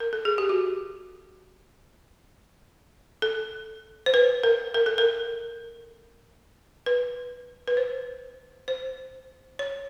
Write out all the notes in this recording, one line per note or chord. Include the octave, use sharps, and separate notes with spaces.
A#4
A4
G#4
G4
F#4
A4
C5
B4
A#4
A#4
A4
A#4
B4
B4
C5
C5
C#5